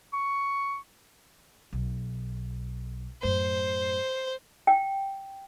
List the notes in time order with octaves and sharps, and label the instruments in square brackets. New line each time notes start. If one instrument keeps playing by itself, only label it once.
[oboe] C#6
[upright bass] B1
[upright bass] F#2 A2 [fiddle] C5
[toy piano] G5